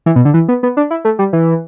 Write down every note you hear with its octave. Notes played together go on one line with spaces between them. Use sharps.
E3
B2
D3
E3
B3
B3
D4
E4
A3
G3
E3